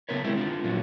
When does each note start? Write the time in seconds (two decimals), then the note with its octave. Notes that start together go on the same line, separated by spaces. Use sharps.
0.09 C#3 F3 B3 A#4 B4 C#5
0.24 G#3 C4 C#4 E4
0.37 D3 F4
0.64 A#2 D3 F3 F#3